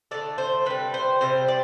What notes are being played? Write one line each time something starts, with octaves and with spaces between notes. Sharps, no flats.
D3 A3 D5
C5
C3 G3 B4
C5
C3 G3 C5
D5